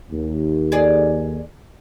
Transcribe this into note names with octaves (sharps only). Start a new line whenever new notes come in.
D#2
G#4 D5